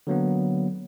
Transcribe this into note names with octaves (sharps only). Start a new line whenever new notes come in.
D3 F#3 A#3 B3